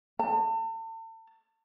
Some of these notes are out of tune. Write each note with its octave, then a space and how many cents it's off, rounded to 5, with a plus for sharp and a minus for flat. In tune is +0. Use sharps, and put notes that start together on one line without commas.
A5 +40